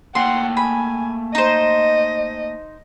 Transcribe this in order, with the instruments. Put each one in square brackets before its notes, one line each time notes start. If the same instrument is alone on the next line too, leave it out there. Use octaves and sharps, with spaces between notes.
[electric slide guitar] A3 A#3 G5 [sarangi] F#5 [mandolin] C6
[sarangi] G#5 [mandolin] B5
[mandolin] D#4 C5 [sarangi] D#5